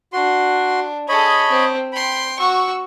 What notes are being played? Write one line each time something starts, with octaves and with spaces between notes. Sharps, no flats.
D4 F#4 C6
G#4 A4 C#5 D#5 B5
C4
G5 B5 C6
F#4 C#6 E6